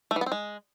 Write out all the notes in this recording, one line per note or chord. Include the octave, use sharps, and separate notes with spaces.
A3
E3
B3
C4
G#3